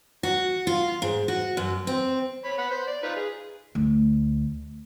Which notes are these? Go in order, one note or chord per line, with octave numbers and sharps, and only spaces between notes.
F#4
F4
G#2
F#4
F#2
C4
C#5 B5
B3 F#5 B5
C5
D5
D#4 F4 B4
G#4
D2